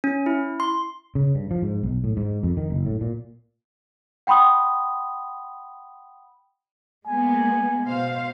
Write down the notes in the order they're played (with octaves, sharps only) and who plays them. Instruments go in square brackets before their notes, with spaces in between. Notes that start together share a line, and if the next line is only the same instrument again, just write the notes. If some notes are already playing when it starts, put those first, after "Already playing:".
[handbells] C#4
E4
C6
[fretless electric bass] C#3
G2
F3
G#2
B1
A2
G#2
F2
D#3
F#1
A2
A#2
[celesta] F#5 G5 B5 C6 D#6
[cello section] G#3 A#3 B3 [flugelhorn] G#5
[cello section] B2 C5 F5